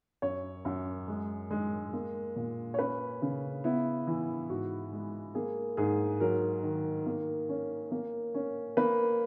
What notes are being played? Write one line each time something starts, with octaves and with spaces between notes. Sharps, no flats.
F#2 C#5
F#2
G#3
G#3
A#3
A#2
C#5
C#4 B4
C#3
B3 E4
E3
G#2 F#4
G#3
A#3 G#4
G#2 G#4
F#3 A#4
D#3
A#3
C#4
A#3
C#4
A#3 B4